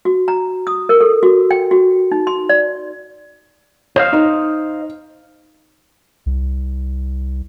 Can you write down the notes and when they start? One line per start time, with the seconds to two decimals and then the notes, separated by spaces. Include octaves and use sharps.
0.05 F#4
0.28 A#5
0.67 D#6
0.89 A#4
1.01 A4
1.23 F#4
1.51 G5
1.71 F#4
2.12 D#4
2.27 C6
2.49 D5
3.96 C5 C#5 D#5 F5
4.13 D#4
6.26 C2